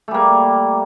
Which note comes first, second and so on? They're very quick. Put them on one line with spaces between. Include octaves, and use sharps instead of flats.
A3 G3 A#3